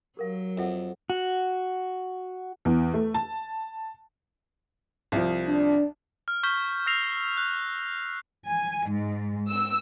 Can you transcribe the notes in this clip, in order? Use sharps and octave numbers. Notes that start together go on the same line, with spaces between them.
F#3 G4 A#4 F5
F2 A4 E5 F#5
F#4
E2
A3
A5
C2 F3
D4
F6
C#6 F6 G6 B6 G7
E6 F6 A#6 C7 F7
F#6
G#5
G#2
E6